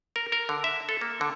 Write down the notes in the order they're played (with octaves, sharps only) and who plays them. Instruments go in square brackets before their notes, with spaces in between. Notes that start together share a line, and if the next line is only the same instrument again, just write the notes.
[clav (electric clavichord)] A#4
A#4
D3
E5
A4
A#3
D3